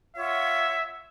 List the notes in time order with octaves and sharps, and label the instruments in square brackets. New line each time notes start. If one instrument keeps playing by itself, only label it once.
[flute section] F4 C#5 F#5 [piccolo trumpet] E5